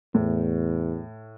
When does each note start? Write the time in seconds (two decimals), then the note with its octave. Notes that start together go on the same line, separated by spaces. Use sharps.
0.15 E2 A2